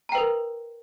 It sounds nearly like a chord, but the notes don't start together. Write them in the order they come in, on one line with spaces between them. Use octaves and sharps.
A#5 G5 B4 A#4